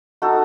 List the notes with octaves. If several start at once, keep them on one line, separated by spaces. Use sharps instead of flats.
D#4 F#4 A4